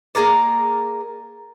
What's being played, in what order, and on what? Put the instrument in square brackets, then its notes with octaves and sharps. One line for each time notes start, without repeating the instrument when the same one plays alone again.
[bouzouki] A#3 G#4 A#4 D5